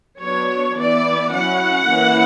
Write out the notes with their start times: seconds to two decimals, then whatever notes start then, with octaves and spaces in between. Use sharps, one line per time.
0.20 F#3 B3 D4 C#5
0.76 E3 B3 E4 D5
1.32 F#3 C#4 E4 F#5
1.88 E3 A#3 C#4 E4